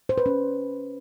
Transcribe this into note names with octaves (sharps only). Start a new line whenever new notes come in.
C5
B4
C#4